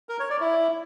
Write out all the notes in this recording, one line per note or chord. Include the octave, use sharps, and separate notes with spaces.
A#4
C#5
D5
E4